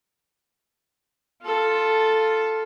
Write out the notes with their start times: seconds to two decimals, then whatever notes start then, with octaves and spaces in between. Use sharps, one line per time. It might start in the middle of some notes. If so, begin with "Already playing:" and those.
1.43 F4 A4